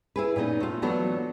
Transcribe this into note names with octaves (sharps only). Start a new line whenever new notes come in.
E4 G#4 B4
A#2 B3 C#4 D#4
A3 F4
E3 F#3 A3 B3 D4 F#4